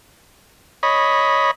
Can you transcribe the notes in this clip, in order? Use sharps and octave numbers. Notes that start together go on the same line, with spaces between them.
C#5 D#5 B5